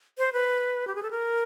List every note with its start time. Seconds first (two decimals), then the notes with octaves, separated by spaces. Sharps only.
0.18 C5
0.33 B4
0.87 G4
0.95 G#4
1.03 A4
1.11 A#4